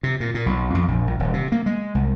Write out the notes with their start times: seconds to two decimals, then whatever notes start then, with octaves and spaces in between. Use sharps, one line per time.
0.03 C3
0.20 A#2
0.34 A#2
0.46 B1
0.75 F2
0.88 A#1
1.07 A#1
1.19 D#1
1.33 C3
1.52 A#3
1.66 G#3
1.95 C2